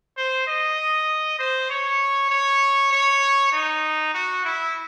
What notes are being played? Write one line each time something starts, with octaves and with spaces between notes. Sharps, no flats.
C5
D#5
C5
C#5
C#5
C#5
D#4
F#4
E4